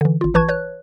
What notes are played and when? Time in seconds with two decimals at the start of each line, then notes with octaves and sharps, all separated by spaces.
0.01 D3 E3
0.21 G#1 F4
0.34 A#1 E3 B4 A5 C#6 G#6
0.49 B4 C#5 F#6